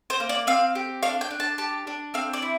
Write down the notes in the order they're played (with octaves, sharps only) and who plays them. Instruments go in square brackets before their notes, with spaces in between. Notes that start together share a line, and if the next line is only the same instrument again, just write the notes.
[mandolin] C5
A#3
D5
C4 F5
G4
D4 F5
G5
D4
A5
G4 A5
D4
C4 F5
D5
E4